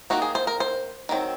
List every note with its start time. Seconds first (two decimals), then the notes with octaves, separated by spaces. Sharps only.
0.10 D#3 A#3 D#4 F#4
0.22 G#4
0.35 C5
0.47 A#4
0.60 C5
1.09 D#3 F#3 C4